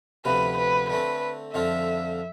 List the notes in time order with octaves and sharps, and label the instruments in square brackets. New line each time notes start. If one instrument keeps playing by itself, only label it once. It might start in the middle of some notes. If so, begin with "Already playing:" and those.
[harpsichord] D2 C3 F3 B3 [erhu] B4
[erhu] B4
[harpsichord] D3 A3 C4 [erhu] B4
[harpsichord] F2 D3 F3 C4 F4 [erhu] E5